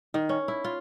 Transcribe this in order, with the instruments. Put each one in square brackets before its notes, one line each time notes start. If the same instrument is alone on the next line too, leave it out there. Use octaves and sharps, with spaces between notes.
[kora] D#3
C#4
E4
F4